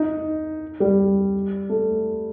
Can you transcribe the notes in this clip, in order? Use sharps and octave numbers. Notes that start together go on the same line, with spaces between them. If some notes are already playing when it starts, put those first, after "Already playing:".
Already playing: D#4
G3
A3